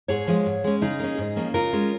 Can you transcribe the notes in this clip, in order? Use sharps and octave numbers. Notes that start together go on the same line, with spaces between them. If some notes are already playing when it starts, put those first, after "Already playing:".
G#2 G#4 C#5
F3 G#3
G#2
G#3 C#4
C#3 D#4 G#4
A#3 C#4
G#2
F3 A#3 C#4
C#3 F4 A#4
G#3 C#4